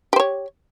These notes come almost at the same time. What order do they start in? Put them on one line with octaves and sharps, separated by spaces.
G4 C5 C#5